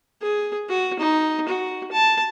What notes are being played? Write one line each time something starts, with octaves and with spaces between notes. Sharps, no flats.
G#4
F#4
D#4
F#4
A5